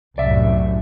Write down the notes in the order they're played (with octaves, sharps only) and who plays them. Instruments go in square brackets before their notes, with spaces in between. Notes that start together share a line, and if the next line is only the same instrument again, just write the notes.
[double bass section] C2 F#2 A2 [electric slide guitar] D5 E5